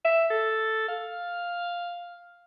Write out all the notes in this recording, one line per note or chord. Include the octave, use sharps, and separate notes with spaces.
E5
A4
F5